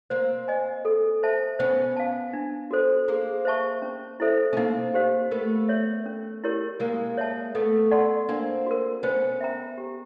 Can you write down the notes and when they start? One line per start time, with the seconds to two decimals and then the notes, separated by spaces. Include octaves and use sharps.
0.10 A#3 C4 C5
0.48 D#5 G#5
0.85 A4
1.23 C5 E5 A5
1.59 B3 C#4 C5
1.97 F5 A5
2.33 D4
2.71 F#4 A4 C5
3.08 A#3 C4 G#4
3.45 C5 E5 A5 C#6
3.82 C#4
4.20 E4 A4 C5 E5
4.53 C#4
4.57 A#3 C4 D#4
4.94 G4 C5 F5
5.31 A3 B3 A#4
5.69 C#5 E5
6.06 C#4
6.44 E4 G4 A#4 C#5
6.80 G#3 A#3 A#4
7.17 C#5 E5 A5
7.55 A3 B3 A4
7.91 D5 F#5 A5 C6
8.29 A#3 C4 D4
8.66 F#4 A#4
9.03 B3 C#4 C5
9.41 E5 G5 A#5
9.78 G4